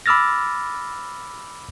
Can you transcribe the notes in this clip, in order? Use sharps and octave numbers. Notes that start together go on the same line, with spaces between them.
B5 D6 E6 F6 A6 A#6